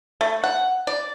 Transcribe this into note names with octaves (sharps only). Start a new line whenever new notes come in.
A3
F#5
D5